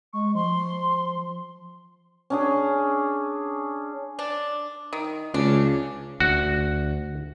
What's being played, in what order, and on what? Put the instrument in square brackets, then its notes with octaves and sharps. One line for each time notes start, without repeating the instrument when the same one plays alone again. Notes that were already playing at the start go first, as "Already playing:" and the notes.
[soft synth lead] G#3 [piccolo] C#6
[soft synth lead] F3 [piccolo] C6
[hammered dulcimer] C#4 D4 G#4
[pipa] D4
D#3
[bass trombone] C#2 [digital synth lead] C#3 [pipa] D4
[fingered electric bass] D2 [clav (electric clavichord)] F#4